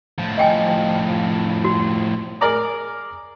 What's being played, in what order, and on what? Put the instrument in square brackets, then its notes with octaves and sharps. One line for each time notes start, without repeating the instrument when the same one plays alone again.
[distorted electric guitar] A2 F3
[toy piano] D#5 G5 G#5
F#4
[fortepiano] G#4 A#4 D5 A#5 D6